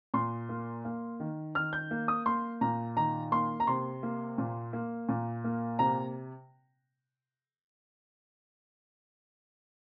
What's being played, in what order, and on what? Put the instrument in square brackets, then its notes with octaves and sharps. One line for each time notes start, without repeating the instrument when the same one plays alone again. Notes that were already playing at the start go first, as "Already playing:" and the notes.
[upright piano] A#2 C6
A#3
A#3
D#3
D#3 F6
G6
A#3
D#6
A#3 C6
A#2 A#5
D#3 A#5
A#3 C6
A#5
C3 C6
A#3
A#2
A#3
A#2
A#3
C3 A#5